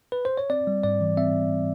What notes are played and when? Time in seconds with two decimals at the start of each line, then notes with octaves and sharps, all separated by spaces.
0.12 B4
0.25 C5
0.38 C#5
0.50 C4 D5
0.67 G3
0.84 G#2 D5
1.01 E3
1.17 C4 E5